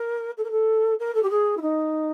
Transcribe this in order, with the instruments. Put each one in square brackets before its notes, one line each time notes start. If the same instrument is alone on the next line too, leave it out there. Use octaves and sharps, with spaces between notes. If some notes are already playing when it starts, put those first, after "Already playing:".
Already playing: [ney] A#4
A4
A#4
A4
A#4
A4
G4
G#4
E4
D#4